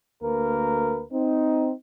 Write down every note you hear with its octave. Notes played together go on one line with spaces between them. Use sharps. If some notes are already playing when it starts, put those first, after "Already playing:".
D2 A#3 A#4 B4
C4 D#4